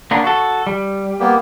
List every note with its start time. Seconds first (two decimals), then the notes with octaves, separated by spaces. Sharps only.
0.11 A#3 B3 D4
0.24 F#4 A4
0.67 G3
1.20 A#3 B3 G4